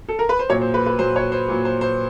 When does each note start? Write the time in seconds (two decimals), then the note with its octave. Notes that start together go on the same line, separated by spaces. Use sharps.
0.08 A4
0.19 A#4
0.29 B4
0.39 C5
0.49 A#2 F#3 C#5
0.62 C5
0.74 B4
0.86 B4
0.99 A#2 F#3 C5
1.16 C#5
1.32 C5
1.48 A#2 F#3
1.65 C5
1.81 C5